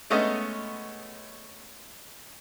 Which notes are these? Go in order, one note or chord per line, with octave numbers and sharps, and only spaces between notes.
G#3 A3 B3 C#4 D#5